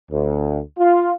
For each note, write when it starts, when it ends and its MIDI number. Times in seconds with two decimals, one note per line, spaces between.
0.12 0.60 38
0.79 1.13 65